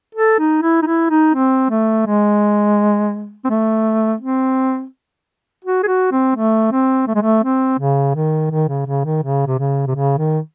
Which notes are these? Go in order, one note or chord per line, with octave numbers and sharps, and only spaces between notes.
A4
D#4
E4
D#4
E4
D#4
C4
A3
G#3
C4
A3
C4
F#4
G#4
F#4
C4
A3
C4
A3
G#3
A3
C4
C#3
D#3
D#3
C#3
C#3
D#3
C#3
C3
C#3
C3
C#3
D#3